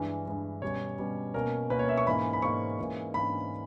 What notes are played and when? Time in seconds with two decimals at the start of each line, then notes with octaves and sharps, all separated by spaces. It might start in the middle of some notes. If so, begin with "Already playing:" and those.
Already playing: G2 E3 G#3
0.26 G2 E3 G#3
0.62 B2 G3 C#4 C#5
0.99 B2 G3 C#4
1.34 B2 A#3 C#4 A#4
1.70 B2 A#3 C#4 B4
1.79 C#5
1.89 E5
1.97 C#6
2.06 G#2 E3 A#3 C#4 B5
2.33 B5
2.42 G#2 E3 A#3 C#4 C#6
2.79 G#2 E3 A#3 C#4
3.14 G#2 E3 A#3 C#4 B5